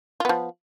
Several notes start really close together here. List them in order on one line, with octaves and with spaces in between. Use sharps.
F4 B3 F3